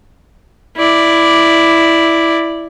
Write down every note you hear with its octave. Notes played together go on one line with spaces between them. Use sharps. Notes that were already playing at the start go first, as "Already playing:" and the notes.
E4 D5